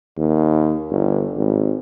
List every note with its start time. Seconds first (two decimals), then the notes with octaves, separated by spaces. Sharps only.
0.17 D#2
0.91 G1
1.36 G#1